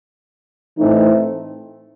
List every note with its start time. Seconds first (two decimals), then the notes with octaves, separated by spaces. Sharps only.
0.77 A2 E3 A3 C4 D#4